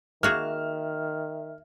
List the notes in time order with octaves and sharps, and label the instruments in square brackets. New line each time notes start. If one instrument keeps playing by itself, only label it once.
[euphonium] D#3 [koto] A#3 F#4 G#4 [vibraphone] E5 [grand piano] F6